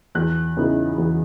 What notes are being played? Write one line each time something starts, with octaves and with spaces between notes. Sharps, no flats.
E2 F#6
C#3 E3 B3 D#4
E2